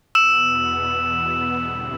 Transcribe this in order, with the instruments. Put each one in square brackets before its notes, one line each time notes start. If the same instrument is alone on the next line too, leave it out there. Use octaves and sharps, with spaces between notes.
[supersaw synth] E2 B2 B3 [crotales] E6 E7
[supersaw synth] G2 D3 G3 C4 E4